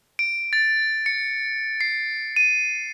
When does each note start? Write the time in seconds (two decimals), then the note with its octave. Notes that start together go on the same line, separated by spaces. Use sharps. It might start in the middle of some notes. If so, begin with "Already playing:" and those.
0.19 D7
0.53 A6
1.06 C#7
1.81 C7
2.36 D#7